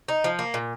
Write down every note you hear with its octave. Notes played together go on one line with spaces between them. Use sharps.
D#4
F3
A#3
A#2